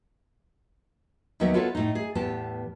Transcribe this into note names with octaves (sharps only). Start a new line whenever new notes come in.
D#2 D#3 F#3 B3 E5
B3 F4 F#4 A4 B4 C#5
A2 D#4
G#4
E2 A2 B3 G4 A5